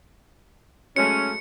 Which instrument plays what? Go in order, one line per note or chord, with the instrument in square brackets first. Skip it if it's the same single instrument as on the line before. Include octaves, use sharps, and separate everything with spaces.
[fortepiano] F#3 G#3 A3 [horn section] C#4 [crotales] C#7